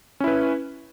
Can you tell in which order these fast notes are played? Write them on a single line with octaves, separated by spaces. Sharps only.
C#4 E4 B4